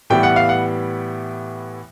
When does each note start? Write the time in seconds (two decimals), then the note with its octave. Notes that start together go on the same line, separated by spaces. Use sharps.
0.10 A2 E3 G3 B3 G5
0.23 F#5
0.36 F5
0.49 F#5